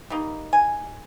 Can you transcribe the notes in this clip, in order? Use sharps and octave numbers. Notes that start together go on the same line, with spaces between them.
G3 A#3 D#4
G#5